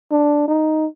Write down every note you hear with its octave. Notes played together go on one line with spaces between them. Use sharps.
D4
D#4